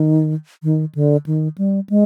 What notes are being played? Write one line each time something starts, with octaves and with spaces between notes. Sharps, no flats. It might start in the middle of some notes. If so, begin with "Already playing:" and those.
Already playing: D#3
D#3
D3
D#3
G3
G#3